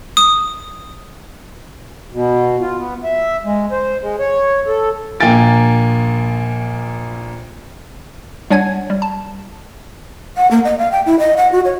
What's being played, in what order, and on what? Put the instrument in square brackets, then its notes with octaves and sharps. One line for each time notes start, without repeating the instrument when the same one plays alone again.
[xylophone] D#6
[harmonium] B2
F4
B3
E5
G#3
C5
G#3
C#5
A4
[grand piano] A#1 A#3 G5 G#5 A6 D7
[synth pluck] G3 D4 C#5 F#5 G#5 G#6
G3
A5
[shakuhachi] F#5
A#3
D#5
F5
G5
E4
D#5
F#5
F#4
C#5